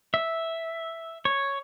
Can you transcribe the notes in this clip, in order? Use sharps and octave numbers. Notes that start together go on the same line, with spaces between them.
E5
C#5